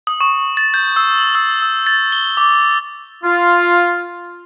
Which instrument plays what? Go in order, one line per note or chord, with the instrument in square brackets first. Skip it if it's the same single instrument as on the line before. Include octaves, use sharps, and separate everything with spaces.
[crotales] D#6
C#6
A6
G6
E6
F#7
E6
E6
A6
G7
D6
[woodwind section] F4